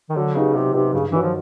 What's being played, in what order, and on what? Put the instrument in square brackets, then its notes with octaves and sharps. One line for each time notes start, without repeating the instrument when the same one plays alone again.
[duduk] D#3
[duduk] D3 [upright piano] F#3
[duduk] C#3 [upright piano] B3 D#4 G4
[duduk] C3 [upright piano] F#3
[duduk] C3 [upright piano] B3 D#4 G4
[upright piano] G2 [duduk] C#3
[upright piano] D#3 F#3 [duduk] E3
[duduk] F3